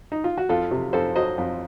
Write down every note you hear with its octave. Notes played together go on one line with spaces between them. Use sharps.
D#4
F4
F#4
F2 F4 A4
C3
F2 A4 C5
F#3 C5 D#5
F2